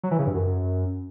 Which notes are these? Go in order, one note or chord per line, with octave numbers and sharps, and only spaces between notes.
F#3
E3
C#3
G2
F#2